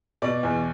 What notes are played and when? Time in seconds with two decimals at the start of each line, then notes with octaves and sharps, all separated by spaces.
0.22 B2 D5
0.43 E2